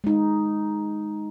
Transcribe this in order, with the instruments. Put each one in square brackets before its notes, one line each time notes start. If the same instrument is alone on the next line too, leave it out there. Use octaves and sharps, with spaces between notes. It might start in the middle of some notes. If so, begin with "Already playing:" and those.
[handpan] G#3 D#4